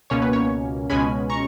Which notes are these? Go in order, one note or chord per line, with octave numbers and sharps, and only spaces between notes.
C#2 B2 A#3 C#4 C#5
B4
C#5
C#2 B2 G#3 C#4 G#5 B5
A#5 C#6